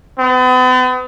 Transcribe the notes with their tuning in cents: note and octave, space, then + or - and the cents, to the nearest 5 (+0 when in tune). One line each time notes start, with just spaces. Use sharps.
B3 +45